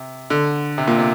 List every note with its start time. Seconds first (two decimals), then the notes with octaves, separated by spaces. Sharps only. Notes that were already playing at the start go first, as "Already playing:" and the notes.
Already playing: C3
0.30 D3
0.78 C3
0.88 A#2
0.99 C3